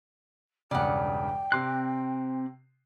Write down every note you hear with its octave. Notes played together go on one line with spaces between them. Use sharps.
E1 G2 C#3 D5 F#5 G5
C3 C4 C6 D6 F#6 C7